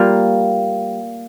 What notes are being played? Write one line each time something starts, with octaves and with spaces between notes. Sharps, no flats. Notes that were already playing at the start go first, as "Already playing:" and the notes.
Already playing: G3 A#3 F4 A#4